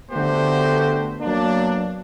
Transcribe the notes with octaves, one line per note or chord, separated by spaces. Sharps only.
D3 A3 B3 F#4 G4 C5
F#3 A#3 B3 D4